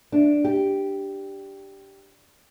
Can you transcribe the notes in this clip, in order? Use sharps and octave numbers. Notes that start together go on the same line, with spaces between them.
D4
G4